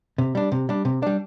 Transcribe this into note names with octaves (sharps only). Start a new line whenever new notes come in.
C3
G3 D4
C3
G3 D4
C3
G3 D4